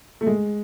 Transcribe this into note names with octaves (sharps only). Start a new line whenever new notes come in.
A3
G#3